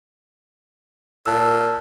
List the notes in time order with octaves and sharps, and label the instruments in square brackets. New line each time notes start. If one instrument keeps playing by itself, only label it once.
[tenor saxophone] A#2 [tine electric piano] A5 E6